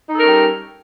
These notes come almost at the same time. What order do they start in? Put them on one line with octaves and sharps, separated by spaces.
D#4 A4 A#4 C#4 G3